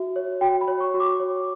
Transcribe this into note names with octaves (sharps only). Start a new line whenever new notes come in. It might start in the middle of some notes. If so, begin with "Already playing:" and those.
Already playing: F#4 E5
C#5
F#4 G5
B5
C#5
C#6
F#4
D6
C#5